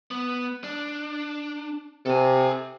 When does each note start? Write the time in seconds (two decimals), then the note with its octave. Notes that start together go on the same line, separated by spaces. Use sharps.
0.11 B3
0.64 D4
2.06 C3 A4 G#5